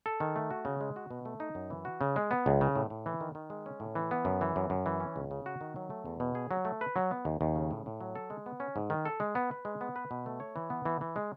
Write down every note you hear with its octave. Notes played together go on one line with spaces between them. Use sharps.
A4
D#3
A3
F#4
C#3
G#3
F#4
B2
A3
D#4
F#2
E3
F#4
C#3
G#3
B3
C#2
C#3
A2
A2
E3
D#3
D#3
G#3
C#4
A2
E3
B3
F#2
E3
F#2
F#2
E3
C#4
C#2
C#3
F#4
D#3
F#3
A3
E2
B2
G#4
F#3
A3
B4
F#3
B3
D#2
D#2
C#3
A2
A2
F#3
A4
G#3
B3
C#4
G#2
D#3
A4
G#3
B3
B4
G#3
B3
B4
B2
A3
C#5
E3
B3
E3
E3
G#3